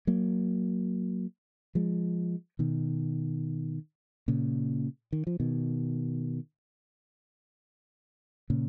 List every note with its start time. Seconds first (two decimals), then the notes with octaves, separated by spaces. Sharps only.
0.07 F#3 A#3
1.75 F3 G#3
2.59 B2 D#3
4.28 A#2 C#3
5.12 D#3
5.27 F3
5.40 B2 D#3
8.50 A#2 C#3